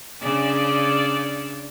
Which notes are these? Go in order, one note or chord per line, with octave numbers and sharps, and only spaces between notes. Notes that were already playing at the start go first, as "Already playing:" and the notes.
C#3 D4 D5